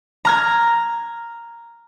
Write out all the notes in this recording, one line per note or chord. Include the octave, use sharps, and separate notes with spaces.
A#5 F6 G#6